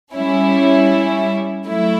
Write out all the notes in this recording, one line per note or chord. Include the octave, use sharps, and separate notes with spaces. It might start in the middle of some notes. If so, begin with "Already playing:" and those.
G3 C#4 E4
F#3 A3 E4